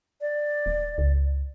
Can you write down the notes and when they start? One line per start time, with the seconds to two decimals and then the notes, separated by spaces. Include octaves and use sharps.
0.21 D5
0.66 D#1
0.98 C#2